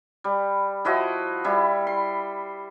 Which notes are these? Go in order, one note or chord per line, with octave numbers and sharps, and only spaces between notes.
G3
F3 E4 F#4 D#5
G3 E4
C6